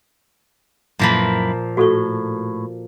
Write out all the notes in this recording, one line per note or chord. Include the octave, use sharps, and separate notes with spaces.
F#2 A#2 F3 A#3 E4 B4
A2 F#4 A4 C#6